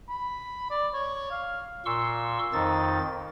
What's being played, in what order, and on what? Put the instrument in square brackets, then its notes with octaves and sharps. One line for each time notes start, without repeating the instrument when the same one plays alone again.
[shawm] B5
D5
C#5
F5
[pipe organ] A#2 C6 C#6 E6
F2 D#3 D#4 A6